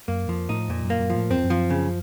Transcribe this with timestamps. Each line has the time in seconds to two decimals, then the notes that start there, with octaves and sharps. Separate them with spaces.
0.08 F#2 A#3
0.28 F2 F3
0.49 A2 D#4
0.69 F2 A#2
0.84 F#2
0.90 A#3
0.99 F#2
1.10 A2 F3
1.30 F#2 C4
1.37 F2
1.44 F#2
1.50 F3
1.70 C#3